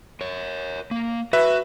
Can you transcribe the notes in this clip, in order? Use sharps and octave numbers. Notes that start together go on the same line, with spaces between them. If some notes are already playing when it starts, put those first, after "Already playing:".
A#4 C#5
A#3
F#4 B4 E5